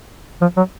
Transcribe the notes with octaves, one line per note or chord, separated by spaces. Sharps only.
F3
F#3